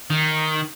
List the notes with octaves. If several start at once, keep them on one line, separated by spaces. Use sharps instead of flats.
D#3